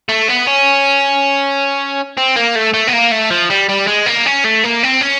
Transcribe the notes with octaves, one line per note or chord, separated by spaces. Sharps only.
A3
B3
C#4
C4
A#3
A3
A3
B3
A#3
A3
F3
G3
G3
G#3
A#3
C#4
A3
A#3
C4
C#4